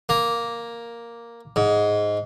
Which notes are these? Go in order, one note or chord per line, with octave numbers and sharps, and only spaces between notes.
A#3
G#2